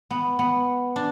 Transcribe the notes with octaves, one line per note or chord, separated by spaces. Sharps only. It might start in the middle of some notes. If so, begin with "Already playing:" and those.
B3
B3
D4